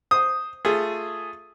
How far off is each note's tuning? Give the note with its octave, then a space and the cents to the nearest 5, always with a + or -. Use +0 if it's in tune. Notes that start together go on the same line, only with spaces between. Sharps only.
C5 +0 D#6 +0
A3 +10 F4 +0 G#4 +0